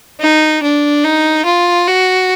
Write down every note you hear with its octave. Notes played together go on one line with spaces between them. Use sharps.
D#4
D4
D#4
F4
F#4